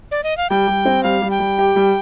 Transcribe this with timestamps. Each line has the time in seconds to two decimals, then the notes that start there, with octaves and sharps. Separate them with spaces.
0.11 D5
0.24 D#5
0.37 F5
0.50 G3 G5
0.68 G3
0.85 C4
1.03 G3 F5
1.22 G3
1.30 G5
1.40 G3
1.58 G4
1.76 G3